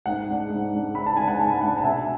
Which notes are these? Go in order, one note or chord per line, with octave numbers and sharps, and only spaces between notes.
G#2 F#5
G#3 D4
G#2
G#3 D4
G#2 B5
A5
G#3 D4 G#5
F#5 A5
G#2 A5
B5
G#3 D4 F#5 A5
A5
B2 E5 G#5